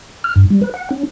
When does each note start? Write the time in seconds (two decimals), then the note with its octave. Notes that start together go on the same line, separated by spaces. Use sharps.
0.24 F6
0.36 G2
0.50 G3
0.62 B4
0.74 F#5
0.91 C#4